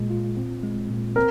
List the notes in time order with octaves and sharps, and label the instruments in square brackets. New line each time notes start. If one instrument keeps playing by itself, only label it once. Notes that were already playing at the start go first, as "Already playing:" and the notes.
Already playing: [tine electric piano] A#2 G#3
F4
C4
G#3
A#2
[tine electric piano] C4 [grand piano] A#4